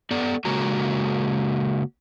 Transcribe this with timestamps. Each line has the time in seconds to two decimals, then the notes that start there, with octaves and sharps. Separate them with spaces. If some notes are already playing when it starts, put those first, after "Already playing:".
0.11 B3 A4 D5
0.45 C#3 G#3 A#3 C#4 F#4 A#5